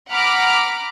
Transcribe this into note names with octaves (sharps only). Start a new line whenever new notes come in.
F#5 A#5 B5 D6 F6 D7